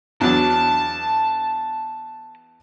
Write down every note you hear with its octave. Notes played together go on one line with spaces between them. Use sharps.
E2 F#3 D4 A5